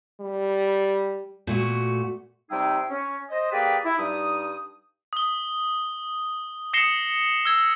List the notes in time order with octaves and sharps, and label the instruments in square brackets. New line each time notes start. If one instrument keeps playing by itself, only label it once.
[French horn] G3
[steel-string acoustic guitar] A#2 A3 F#4
[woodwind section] C3 G3 D#4 G#4 E5 G5
C#4
C5 D#5
A#3 G4 G#4 B4 D5 G5
E4
G2 G3 D#4 D#6
[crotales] D#6 G7
D#6 A#6 C7 C#7 E7 G7
E6 G#6